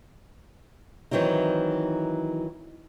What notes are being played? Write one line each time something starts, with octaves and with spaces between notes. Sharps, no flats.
D#3 E3 F#3 C4 D#4